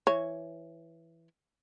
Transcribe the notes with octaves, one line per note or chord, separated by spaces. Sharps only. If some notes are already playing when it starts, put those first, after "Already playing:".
E3 C#5